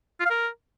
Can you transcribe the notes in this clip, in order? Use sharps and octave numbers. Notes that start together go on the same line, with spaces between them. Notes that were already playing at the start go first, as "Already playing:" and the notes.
F4
F5
A#4